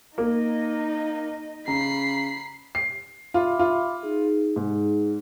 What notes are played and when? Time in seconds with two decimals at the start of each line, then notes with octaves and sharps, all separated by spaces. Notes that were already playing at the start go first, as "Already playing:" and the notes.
0.18 A#3 D#4 D#5
1.68 C#3 A#5 B5 C7
2.75 C7
3.34 F4 E5 B5 D6
3.59 F4
4.03 D#4 G#4
4.56 G#2